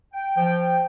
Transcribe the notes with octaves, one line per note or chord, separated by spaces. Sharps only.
G5
F3 G5